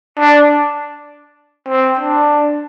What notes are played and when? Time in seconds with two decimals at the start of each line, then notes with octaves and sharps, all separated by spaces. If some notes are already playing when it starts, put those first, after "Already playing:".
0.18 D4
1.69 C4
1.99 D4